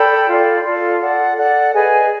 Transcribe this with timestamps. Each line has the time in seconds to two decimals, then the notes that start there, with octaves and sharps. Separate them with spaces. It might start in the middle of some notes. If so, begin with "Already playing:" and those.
Already playing: A4 D5 G5 B5
0.29 F4 A4 D5
0.64 F4 A4 D5
1.01 A4 D5 F#5
1.37 A4 D5 F#5
1.73 G#4 B4 D#5 G#5